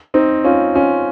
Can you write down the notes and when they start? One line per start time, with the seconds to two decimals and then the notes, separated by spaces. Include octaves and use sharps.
0.14 C4 D#4
0.44 C#4 F4
0.75 C#4 F4